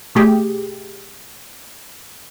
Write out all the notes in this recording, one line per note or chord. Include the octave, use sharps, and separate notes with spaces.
B2 A3 G4 G#4